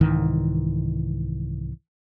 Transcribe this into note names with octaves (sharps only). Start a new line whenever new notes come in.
C2 G#2 D#3 E3